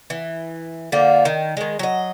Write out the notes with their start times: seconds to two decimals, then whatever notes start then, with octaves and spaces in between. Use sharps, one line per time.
0.10 E3
0.92 D3 F3 A#3
1.25 D#3
1.57 D#3 G#3
1.79 F#3 D#5